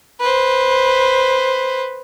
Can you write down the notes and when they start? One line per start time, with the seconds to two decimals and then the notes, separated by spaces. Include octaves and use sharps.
0.21 B4 C5